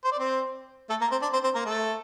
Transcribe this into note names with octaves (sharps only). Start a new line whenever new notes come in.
C5
D5
C4 C5
A3 A4
A#3 A#4
C4 C5
D4 D5
C4 C5
C4 C5
A#3 A#4
A3 A4